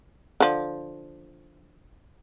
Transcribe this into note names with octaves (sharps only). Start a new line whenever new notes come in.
D3 F3